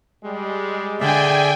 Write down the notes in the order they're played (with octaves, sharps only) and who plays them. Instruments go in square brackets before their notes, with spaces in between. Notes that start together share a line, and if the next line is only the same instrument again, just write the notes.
[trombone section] G3 G#3
[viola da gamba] D3 [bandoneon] G#4 D5 E5 [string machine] G5 G#5